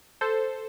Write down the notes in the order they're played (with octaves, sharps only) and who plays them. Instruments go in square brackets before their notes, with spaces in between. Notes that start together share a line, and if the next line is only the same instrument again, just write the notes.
[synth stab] A4 C5